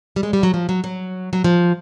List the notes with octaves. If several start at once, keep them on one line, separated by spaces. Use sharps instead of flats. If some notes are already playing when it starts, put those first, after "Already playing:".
G3
G#3
G3
F#3
F3
F#3
F#3
F#3
F3